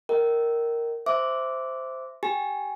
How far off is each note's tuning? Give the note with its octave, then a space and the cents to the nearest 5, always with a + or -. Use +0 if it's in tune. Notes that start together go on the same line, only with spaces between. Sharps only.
A#4 +0 D#5 +0 G5 -30
C5 -5 E5 +0 D6 -10
G4 +0 G#5 +0